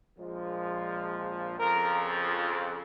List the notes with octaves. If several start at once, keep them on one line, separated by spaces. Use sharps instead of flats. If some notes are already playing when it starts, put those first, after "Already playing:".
A#1 A#2 F3 G#3
F2 C#3 F3 A#4